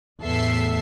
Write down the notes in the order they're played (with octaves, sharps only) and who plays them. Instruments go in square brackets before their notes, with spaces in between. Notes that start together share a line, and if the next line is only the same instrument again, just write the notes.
[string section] E2 A2 A4 E5 C7